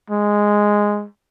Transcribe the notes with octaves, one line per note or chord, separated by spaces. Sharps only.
G#3